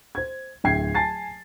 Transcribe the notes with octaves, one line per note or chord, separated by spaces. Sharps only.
C5 G#6
D1 D3 E5 G5 G#6 C7
G#5 A5 A6 C7